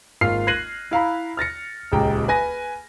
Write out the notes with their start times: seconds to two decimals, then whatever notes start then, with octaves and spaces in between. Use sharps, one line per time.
0.21 G#1 A#3 F4 F6 C7
0.47 F#6 G#6 A#6 C7 D#7 F#7
0.91 E4 F5 A#5 B5
1.37 F6 A6 A#6 C#7
1.92 D#1 C#2 G5 A#5
2.28 B4 G#5 A#6